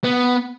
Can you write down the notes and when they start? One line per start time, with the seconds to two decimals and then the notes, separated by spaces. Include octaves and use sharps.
0.04 B3